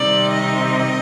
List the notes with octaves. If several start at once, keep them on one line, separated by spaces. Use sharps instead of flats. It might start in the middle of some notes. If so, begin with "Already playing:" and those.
Already playing: C3 D#3 G3 C4 D#4 D5
D#5